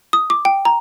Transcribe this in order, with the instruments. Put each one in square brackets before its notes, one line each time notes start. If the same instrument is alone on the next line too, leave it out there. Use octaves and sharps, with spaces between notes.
[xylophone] D#6
D6
G5
A#5